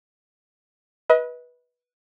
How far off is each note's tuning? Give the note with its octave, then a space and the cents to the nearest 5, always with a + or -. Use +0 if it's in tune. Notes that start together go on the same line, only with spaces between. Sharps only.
B4 -15 D#5 +35